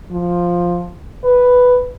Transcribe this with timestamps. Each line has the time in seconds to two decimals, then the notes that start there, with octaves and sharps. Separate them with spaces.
0.11 F3
1.24 B4